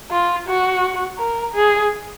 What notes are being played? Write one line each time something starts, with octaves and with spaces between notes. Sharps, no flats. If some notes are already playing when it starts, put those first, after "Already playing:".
F4
F#4
A#4
G#4